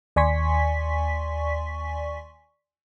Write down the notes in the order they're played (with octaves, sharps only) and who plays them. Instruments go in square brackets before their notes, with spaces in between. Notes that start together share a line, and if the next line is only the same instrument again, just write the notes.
[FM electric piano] D#2 D5 G#5 C6 C#6 B6